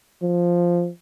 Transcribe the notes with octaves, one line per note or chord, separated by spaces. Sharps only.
F3